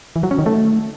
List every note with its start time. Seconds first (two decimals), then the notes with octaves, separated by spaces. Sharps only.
0.16 E3
0.23 F#3
0.31 C#4
0.39 D#3
0.46 A3